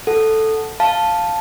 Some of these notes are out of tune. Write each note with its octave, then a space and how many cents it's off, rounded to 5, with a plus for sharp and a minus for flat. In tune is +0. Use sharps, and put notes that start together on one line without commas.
A4 +0 F#5 +0
F5 +0 A5 +0